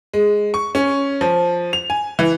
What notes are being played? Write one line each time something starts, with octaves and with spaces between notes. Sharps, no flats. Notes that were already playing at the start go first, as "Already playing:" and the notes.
G#3
C#6
C#4
F3
F7
G#5
E3